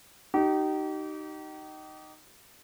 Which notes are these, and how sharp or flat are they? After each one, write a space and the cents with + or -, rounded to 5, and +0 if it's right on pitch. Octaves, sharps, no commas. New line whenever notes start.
D#4 -10 G4 -35